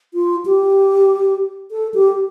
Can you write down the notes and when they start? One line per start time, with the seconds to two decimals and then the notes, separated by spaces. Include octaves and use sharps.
0.14 F4
0.46 G4
1.71 A4
1.94 G4